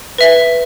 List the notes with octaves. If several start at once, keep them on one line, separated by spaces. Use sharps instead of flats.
B4 E5